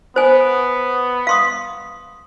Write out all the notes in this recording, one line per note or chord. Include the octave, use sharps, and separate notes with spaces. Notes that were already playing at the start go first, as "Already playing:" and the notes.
B3 C5 G#5
F5 C6 D#6